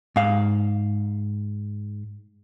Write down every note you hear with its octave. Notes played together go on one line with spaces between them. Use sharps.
G#2 F5